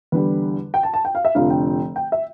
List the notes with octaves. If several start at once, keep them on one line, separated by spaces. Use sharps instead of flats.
E2 D3 G3 B4
G5
A5
A5
G5
F5
E5
F1 F2 D3 F3 F5
G5
G5
E5